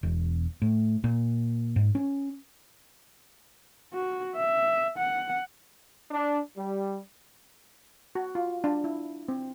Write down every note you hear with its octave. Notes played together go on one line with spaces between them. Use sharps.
E1
A2
A#2
G#2
C#4
F#4
E5
F#5
D4
G3
F#4
F4
D4
E4
C4